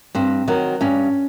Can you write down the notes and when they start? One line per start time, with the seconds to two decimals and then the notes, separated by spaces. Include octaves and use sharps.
0.15 G2 C4
0.48 D#3 F#3
0.81 G2 C#4